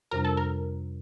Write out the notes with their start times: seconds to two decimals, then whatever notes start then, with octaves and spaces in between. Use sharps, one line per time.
0.11 F2 C3 G3 D4 A#4
0.25 A4
0.37 A#4